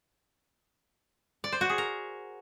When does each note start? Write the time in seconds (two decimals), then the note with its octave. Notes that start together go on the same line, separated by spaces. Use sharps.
1.44 D5
1.52 C5
1.61 F#4
1.70 G#4
1.78 A#4